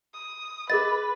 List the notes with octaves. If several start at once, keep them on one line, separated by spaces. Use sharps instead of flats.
D#6
G#4 A#4 B4 D#5 A6